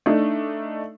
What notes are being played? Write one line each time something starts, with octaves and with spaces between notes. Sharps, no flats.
A3 D4 D#4